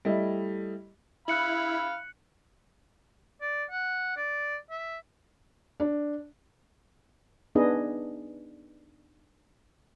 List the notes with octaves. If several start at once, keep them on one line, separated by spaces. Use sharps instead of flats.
G3 A3 E4 D#5
E4 F5 B5 F#6 C#7 F#7
D5
F#5
D5
E5
D4
B3 D4 D#4 G#4 B4 D#5